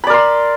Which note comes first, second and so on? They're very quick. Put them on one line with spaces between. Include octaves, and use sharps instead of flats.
B5 D5 A#4 C6